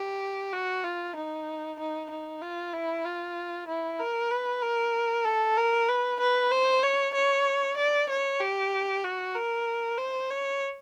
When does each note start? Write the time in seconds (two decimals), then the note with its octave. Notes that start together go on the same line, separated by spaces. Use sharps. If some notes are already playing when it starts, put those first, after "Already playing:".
Already playing: G4
0.53 F#4
0.84 F4
1.15 D#4
1.79 D#4
2.10 D#4
2.41 F4
2.73 E4
3.05 F4
3.68 E4
3.99 A#4
4.31 B4
4.62 A#4
5.25 A4
5.57 A#4
5.88 B4
6.20 B4
6.51 C5
6.83 C#5
7.14 C#5
7.77 D5
8.09 C#5
8.40 G4
9.04 F#4
9.35 A#4
9.97 C5
10.30 C#5